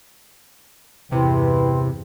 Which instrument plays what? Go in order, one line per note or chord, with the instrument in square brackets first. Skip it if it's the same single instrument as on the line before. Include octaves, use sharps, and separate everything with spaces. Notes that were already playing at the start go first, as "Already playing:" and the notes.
[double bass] E2 G2 [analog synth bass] C3 [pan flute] E4 [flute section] B4 G5 C6